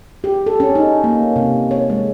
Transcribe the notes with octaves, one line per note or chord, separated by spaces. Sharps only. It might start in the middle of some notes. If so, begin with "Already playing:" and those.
G4
A4
C#4
D#4
A#3
C3
C#5
G#3